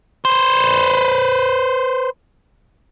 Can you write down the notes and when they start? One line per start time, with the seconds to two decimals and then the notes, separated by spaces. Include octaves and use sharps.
0.25 B4 C5